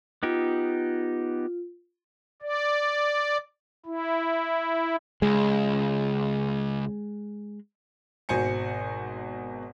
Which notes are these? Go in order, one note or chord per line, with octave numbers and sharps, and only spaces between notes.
B3 D#4 F4 G4
D5
E4
C#2 G#3
G#1 B2 C5 G#5 C#7